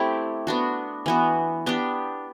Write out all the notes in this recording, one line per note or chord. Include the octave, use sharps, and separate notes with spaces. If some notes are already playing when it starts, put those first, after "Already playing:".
Already playing: A3 C4 E4 G4
B3 D4 F#4
E3 B3 F#4
B3 D4 G4